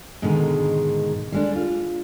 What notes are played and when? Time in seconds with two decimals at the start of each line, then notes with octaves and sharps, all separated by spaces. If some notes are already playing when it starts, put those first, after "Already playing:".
0.22 G#2 B2 D3 D#3 G#3
1.32 G3 G#3 D4
1.56 F4